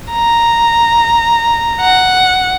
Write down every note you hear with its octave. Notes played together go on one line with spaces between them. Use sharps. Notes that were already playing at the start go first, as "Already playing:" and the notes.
A#5
F#5